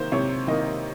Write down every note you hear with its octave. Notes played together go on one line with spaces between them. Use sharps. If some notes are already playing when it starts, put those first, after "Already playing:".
Already playing: C3 D#3 A#3 C5
C3 C#5
D#3 A#3 D#5